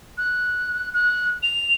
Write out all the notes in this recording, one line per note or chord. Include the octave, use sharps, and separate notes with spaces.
F#6
F#6
F7